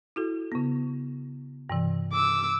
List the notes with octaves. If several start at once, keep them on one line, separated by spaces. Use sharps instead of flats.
E4 F#4 A4
C#3 B3
G2 C3 E3
D6 E6